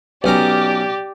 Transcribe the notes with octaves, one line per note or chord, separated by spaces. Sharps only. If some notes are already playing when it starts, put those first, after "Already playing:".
B1 C#4 G4 D5 A#5